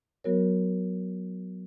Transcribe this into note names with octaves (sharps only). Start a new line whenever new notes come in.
F#3 B3 F#4 A#4 C#5